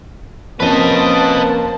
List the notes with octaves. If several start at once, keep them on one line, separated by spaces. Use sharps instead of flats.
F2 A#3 C#4 B4 C5 D#5 A5